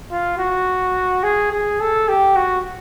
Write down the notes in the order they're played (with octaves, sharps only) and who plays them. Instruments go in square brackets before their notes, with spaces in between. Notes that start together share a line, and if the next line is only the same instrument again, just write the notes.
[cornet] F4
F#4
G#4
G#4
A4
G4
F#4